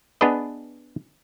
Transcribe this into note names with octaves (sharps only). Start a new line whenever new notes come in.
B3 D4 G#4 B4 D#5